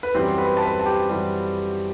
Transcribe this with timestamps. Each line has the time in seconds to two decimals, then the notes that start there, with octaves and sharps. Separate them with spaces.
0.03 B4
0.14 F#2 E3 G3 C4 C5
0.38 B4 B5
0.57 A5
0.62 B4 B5
0.79 A5
0.86 G4 G5
1.09 F#2 E3 G3